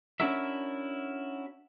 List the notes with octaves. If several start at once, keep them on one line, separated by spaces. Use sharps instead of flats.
C#4 D4 E4 F#4 A#4 E5